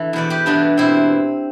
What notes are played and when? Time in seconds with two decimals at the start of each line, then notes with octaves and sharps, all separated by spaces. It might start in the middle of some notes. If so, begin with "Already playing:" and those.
Already playing: E3 D4 A4
0.13 E2 B2 B4 D5
0.30 G4 B4
0.46 G2 E3 B3 D4
0.78 B2 C4 E4